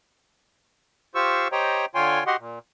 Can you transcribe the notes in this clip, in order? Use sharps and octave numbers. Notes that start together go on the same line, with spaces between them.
F4 G4 C5 C#6 E6
G4 C5 C#5 D#5 G5 A#5
D3 F4 C#5 G5 G#5 C6
F#4 G4 D#5 F#5 C6
A#2